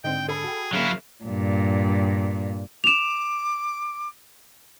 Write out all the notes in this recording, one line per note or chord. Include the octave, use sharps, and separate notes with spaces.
G#2 D3 C4 D4 D#4 G5
G#4 A4 B5
F#4 G5
C#3 F#3 A#3 E4 F5
G2 A#2
D6 E7 F7